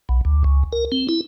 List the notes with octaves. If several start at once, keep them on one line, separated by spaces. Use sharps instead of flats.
B1
D2
C#2
A#4
C4
E4